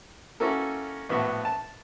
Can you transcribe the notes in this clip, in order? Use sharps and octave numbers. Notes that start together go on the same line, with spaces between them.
A#3 C#4 E4 F#4 A4 A#4
A#1 A2 B3 F#4 E5 C#6
A5